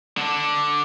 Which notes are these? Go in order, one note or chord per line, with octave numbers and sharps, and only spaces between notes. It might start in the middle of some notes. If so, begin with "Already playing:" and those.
D3 D4